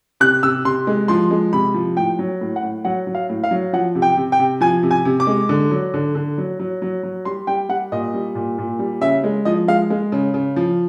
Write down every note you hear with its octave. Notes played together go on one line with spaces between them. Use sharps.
C3 F#6
C3 E6
C3 C6
G#3
F3 C6
G#3
C3 B5
F3
A2 G5
F#3
A2
F#5
A2
F#3 F#5
F#3
F5
A2
F5
F#3
F3 F#5
C3
G5
C3
G5
C3
F3 G#5
C3
G#5
C3
D6
G#3
D3
F#3
D3
D3
F#3
F#3
F#3
F#3
G3 C6
G3 G5
G3 F#5
A#2 D#5
G3
A#2
A#2
G3
C#3 E5
G#3
F3 D#5
G#3 F5
G#3
C#3
C#3
F3